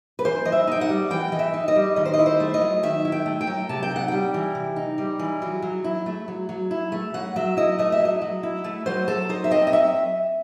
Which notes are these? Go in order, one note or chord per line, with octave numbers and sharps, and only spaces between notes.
B4
E3 C5
E3 D#5
E5
D#4 G5
F#5
G3
E3 G5
E3 D#5
E5
D#4
D#5
G3
D#3 D#5
C5
D#5
E4
C5
A3
D#5
F#3
D#3 E5
E4
G5
A3
G5
F#3
C3 A5
G5
D#4
F#5
G3 G5
E3
C3
D#4
G3
E3
F#3
F#3
E4
A3
F#3
F#3
E4
A3
F#3 F#5
F#3 E5
E4 D#5
A3 D#5
E5
F#3
D#5
F#3
E4
A3
F#3 C5
F#3 A4
D#4 C5
E5
C4 D#5
D#5
F#3 E5